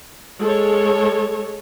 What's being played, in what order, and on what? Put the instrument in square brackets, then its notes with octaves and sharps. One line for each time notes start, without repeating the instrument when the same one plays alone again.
[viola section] G#3 A4 C#5